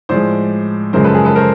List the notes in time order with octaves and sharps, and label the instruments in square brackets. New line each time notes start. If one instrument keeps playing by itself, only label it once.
[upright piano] A2 F3 G#3 C5 D5
F#2 C#3 F3 G#3 A#4 C5
A4 B4
G#4 A#4
A4 B4
A#4 C5